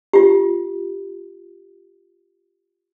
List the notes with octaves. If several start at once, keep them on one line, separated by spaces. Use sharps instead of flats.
F4 G4